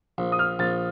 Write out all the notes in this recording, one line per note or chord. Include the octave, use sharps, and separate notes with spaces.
A#1
D#6
F6
A#1 A6